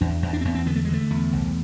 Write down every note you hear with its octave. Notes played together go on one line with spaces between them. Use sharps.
E2 D4
E2
D4
C4
E2 B3
C4
D3 B3
A3
G#3
D3 A3
E2
C2